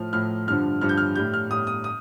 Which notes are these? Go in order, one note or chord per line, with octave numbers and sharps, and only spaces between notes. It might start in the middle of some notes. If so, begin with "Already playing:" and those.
Already playing: A2 F3 F6
A2 F3 F6
G2 D3 F3 F6
G2 D3 F3 F6
G6
F6
A2 G3 G6
F6
A2 G3 D#6
D#6
D#6